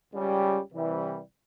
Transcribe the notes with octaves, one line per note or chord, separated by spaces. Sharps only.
C#2 C#3 G3 C#4 G4
C2 C3 E3 G3